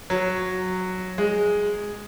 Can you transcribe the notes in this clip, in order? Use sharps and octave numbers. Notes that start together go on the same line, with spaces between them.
F#3
G#3